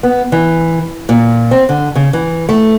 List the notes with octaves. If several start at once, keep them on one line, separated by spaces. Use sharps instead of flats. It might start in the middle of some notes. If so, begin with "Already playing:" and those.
B3
E3
A#2
C4
D3
C#3
E3
A3